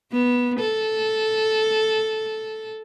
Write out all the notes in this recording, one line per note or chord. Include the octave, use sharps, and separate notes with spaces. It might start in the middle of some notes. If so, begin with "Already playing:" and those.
B3
A4